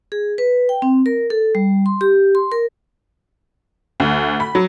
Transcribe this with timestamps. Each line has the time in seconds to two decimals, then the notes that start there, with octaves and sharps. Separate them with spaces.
0.12 G#4
0.38 B4
0.69 G5
0.82 C4
1.06 A#4
1.30 A4
1.55 G3
1.86 C6
2.01 G4
2.35 C6
2.52 A#4
4.00 D2
4.40 B5
4.55 F#3